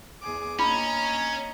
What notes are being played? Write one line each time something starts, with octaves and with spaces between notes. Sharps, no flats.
E2 G#4 D6
A#3 C#4 D4 D#5 A#5 B5